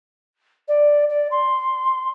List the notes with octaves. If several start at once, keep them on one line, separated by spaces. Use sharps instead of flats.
D5
D5
C6